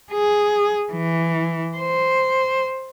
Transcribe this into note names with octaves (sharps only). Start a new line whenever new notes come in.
G#4
E3
C5